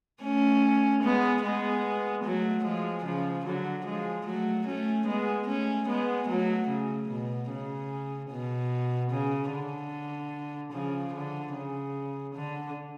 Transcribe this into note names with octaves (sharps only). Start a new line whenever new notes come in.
A3 C#4
G#3 B3
G#3 B3
F#3 A3
F3 G#3
C#3 F3
D3 F#3
F3 G#3
F#3 A3
A3 C#4
G#3 B3
A3 C#4
G#3 B3
F#3 A3
C#3
B2
C#3
B2
C#3
D3
C#3 F3
D3
C#3
D3